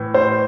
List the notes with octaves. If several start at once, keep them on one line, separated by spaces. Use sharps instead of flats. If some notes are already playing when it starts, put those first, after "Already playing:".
Already playing: A2 E3
C5